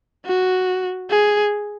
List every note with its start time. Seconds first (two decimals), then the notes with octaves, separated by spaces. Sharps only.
0.26 F#4
1.10 G#4